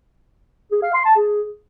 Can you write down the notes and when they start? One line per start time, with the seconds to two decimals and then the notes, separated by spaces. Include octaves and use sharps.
0.71 G#4
0.82 F5
0.94 C6
1.05 A5
1.16 G#4